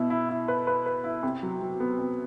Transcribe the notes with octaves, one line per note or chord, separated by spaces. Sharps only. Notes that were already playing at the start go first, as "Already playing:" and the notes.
Already playing: B2 E4
E4
E4
B4
B4
B4
E4
C3
F#3
F#3
B3
C3